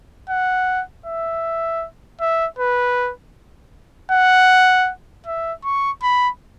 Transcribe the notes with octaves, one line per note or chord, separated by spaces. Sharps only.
F#5
E5
E5
B4
F#5
E5
C#6
B5